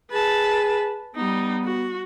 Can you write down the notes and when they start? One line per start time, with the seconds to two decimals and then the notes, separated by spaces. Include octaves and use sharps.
0.11 G#4 B4 A5
1.15 G3 B3 D#4
1.64 F#4